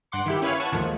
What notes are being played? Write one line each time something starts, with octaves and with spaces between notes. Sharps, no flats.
G2 F#5 C6 D6 C#7
D#3 E4 G4
C#4 E4 B4 C#5 F5
F#5 G#5 A5 C#6
D#2 G#2 D#3 F3 A3